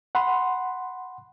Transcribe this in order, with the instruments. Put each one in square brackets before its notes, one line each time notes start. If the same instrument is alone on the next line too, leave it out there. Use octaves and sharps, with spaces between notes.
[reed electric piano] F#5 B5 C6